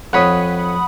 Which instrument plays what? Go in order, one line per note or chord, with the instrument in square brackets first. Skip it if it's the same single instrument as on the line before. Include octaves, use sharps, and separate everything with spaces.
[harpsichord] F2 C#5 [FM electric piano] F#5 B5 D#6